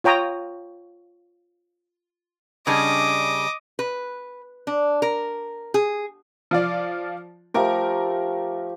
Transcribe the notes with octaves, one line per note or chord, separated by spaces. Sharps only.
F4 C#5 G5 A#5 D#6
C#3 G3 D4 D#5 D6
B4
D4
A#4
G#4
F3 F4 D5
F3 A3 G4 A#4 D6